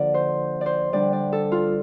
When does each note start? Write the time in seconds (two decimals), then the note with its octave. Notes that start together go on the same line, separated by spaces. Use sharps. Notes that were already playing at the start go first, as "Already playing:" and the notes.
Already playing: D3 F3 A#3 D4 D5
0.14 C5
0.61 C5 D5
0.93 D3 G3 D4 D5
1.13 D5
1.33 A4
1.52 F4